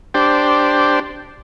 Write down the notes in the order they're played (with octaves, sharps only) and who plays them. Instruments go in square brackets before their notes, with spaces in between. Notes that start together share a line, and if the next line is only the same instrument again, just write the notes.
[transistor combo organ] D4 G4 C5